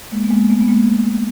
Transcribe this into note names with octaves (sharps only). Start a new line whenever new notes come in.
G#3 A#3
B3
G#3 A#3
A3 B3
B3
G#3 A#3